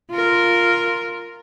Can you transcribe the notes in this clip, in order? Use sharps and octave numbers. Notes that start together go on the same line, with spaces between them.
F4 A#4